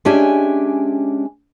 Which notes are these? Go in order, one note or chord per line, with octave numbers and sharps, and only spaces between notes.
G#3 C#4 D4 G4 E5 G#5